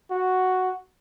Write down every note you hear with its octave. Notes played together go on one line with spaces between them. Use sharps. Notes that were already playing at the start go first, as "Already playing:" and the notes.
F#4